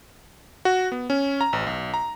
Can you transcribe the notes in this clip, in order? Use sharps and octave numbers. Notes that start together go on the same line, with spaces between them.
F#4
B3
C#4
A#5
A1
B1
A#5